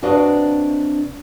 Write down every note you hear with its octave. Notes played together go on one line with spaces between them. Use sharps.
C3 D4 F#4 B4 D#5 F5